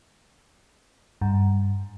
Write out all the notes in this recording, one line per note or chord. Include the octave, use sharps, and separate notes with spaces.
G2